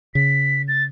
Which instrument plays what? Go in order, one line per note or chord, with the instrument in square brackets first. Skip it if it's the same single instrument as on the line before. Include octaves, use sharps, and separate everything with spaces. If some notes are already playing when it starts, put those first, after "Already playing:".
[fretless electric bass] C#3 [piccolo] B6
[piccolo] A6